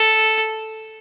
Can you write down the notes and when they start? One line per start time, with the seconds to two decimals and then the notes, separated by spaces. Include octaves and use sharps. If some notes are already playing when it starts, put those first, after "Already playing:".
Already playing: A4